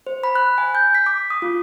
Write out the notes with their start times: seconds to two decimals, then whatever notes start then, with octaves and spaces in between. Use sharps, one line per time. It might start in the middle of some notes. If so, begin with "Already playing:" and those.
0.07 C5
0.24 B5
0.35 F#6
0.58 G#5
0.75 G6
0.95 B6
1.06 D6
1.30 D#6
1.42 F4